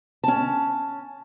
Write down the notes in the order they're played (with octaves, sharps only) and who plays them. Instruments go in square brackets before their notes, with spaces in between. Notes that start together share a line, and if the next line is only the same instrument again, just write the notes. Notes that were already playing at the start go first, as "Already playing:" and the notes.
[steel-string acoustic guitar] C#4 A5